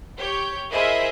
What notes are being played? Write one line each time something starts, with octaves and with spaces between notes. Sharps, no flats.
G4 C#5 G6
E4 G#4 A#4 C5 D#5 E5